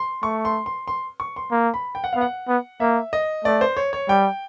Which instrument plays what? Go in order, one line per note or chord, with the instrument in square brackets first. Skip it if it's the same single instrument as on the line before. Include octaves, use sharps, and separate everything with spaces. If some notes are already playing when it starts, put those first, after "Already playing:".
Already playing: [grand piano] C6
[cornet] A3 [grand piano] C#6
[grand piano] C6
C6
C6
C#6
C6
[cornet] A#3
[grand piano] B5
G5
F#5
[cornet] B3 [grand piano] F5
[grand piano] F#5
[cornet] B3
[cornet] A#3 [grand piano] E5
[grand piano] D#5
[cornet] A3 [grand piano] D5
[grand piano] C5
C#5
C#5
[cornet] G3 [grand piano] G5